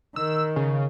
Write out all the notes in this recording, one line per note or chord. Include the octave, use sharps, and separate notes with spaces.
D#3 E6
C#3